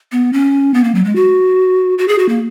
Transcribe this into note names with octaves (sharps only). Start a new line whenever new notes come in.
B3
C#4
B3
A#3
F#3
G#3
F#4
F#4
G#4
F#4
A#3